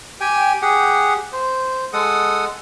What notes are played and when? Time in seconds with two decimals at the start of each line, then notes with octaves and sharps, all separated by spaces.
0.21 G4 G5 G#5
0.62 G4 G#4 F#5
1.33 C5
1.93 G#3 A4 F#5 D#6